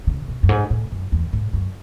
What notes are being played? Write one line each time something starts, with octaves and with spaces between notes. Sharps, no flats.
C#3
B2
F#2
G#2
A2
F#2
E2
G#2
F#2